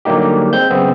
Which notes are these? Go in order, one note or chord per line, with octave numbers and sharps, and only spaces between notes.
D3 F#3 G3 A#3 D#4 G4
G#3 C4 G6
F#2 C#3 B3 C4